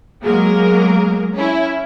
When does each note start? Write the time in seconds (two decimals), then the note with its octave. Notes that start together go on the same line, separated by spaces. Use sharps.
0.22 F#3 G#3 A#3 A#4
1.34 C#4 E4